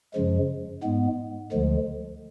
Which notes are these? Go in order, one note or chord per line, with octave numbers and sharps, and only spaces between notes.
F#2 C#3 F3 G#3
G#2 G#3 B3
D2 D3 F3 G#3